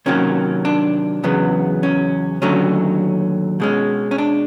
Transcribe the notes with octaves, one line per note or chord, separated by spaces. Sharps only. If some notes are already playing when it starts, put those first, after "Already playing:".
C3 D#3 F#3 A#3 C#4
D4
E2 C#3 F#3 B3
C#4
D#2 D3 F#3 A3 C#4
B2 G#3 C#4
C#4
D4